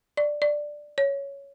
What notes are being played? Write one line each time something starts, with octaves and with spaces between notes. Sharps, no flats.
D5
D5
C#5